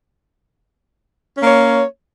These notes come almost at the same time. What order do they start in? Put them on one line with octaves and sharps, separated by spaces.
C#4 A#3 C#5